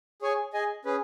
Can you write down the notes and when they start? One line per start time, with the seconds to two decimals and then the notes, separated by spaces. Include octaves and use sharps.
0.22 G#4 C#5 G#5
0.53 G#4 D#5 G#5
0.85 C#4 G#4 B4